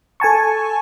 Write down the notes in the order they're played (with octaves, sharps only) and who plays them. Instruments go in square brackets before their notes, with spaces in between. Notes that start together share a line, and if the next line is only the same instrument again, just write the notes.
[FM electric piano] A4 G#5 A5 C#6